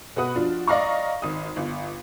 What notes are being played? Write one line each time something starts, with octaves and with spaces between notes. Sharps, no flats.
B2 B4 F#5 D#6
F3 D4 F4 F#4
D5 D#5 F5 A#5 C#6
G#1 D#6
G1